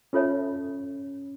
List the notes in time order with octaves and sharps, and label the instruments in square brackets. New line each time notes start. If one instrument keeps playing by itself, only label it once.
[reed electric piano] C#4 [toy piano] F4 A4 C#5 E5 A5